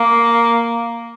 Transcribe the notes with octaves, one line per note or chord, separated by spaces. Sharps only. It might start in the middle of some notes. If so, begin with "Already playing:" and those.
Already playing: A#3